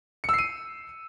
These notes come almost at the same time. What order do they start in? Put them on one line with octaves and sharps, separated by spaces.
C#7 E6 C7 D#7